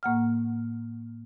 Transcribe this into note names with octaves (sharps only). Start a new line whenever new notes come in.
A2 A#3 F#5 F6